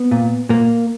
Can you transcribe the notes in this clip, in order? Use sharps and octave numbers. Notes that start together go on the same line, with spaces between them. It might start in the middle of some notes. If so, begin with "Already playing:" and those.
Already playing: B3
A#2
A#2 A#3